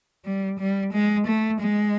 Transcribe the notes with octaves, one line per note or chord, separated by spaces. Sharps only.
G3
G3
G#3
A3
G#3